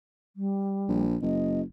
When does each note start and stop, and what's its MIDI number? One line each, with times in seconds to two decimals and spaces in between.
0.36 1.04 55
0.88 1.17 34
1.22 1.62 30
1.22 1.61 75